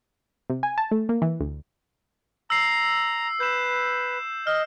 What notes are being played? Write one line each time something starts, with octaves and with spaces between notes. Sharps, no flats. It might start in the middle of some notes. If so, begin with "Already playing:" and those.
C3
G#5
A5
A3
A#3
E3
D2
A#5 E6 C7
B4 G6 E7
D#5 F6